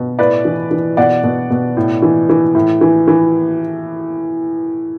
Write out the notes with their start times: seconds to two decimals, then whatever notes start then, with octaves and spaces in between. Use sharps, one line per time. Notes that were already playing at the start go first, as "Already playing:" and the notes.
Already playing: B2
0.19 A2 B4 D5
0.45 E3
0.71 E3
0.97 B2 D5 F#5
1.24 B2
1.50 B2
1.77 A2
2.02 E3
2.29 E3
2.55 A2
2.81 E3
3.08 E3